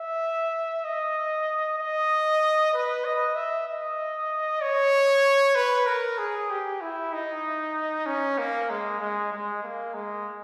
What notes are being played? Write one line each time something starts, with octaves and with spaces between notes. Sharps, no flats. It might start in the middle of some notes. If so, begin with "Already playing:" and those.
Already playing: E5
D#5
D#5
B4
D#5
E5
D#5
C#5
B4
A#4
G#4
G4
E4
D#4
C#4
A#3
G#3
G#3
G#3
A#3
G#3